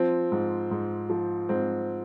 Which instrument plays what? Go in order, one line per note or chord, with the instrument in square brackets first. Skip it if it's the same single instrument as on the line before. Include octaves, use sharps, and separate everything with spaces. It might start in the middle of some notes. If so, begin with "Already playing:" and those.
Already playing: [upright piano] F3 C4
G#2
G#2
F3
G#2 C4